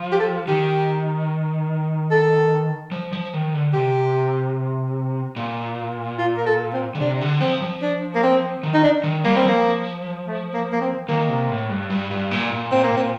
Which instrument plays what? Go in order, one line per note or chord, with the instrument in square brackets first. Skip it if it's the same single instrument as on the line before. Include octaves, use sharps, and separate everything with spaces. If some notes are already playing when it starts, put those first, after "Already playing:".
Already playing: [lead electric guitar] F3
[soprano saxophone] G4
A4
[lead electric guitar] D#3 [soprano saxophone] G4
[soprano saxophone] A4
[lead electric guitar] F3
F3
D#3
D3
[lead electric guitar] C3 [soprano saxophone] G4
[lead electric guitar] A#2
[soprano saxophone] F4
A#4
A4
C4
[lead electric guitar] D3
[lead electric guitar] C3 [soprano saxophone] D4
[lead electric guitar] D3
[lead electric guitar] F3 [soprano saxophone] C4
[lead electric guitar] F3
[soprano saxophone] D4
A#3
C4
[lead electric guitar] D#3
[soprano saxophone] D#4
D4
[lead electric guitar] D#3
[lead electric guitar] G3 [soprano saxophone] A#3
[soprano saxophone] C4
[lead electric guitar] F3 [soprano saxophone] A#3
[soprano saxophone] A3
A#3
A#3
C4
[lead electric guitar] D#3 [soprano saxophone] A#3
[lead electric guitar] C3
A2
G2
G2
G2
A#2
A#2
[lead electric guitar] A#2 [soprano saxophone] C4
[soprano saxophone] A#3
[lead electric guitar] A#2
[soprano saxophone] C4